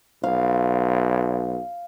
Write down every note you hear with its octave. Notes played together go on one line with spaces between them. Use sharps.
B1 F5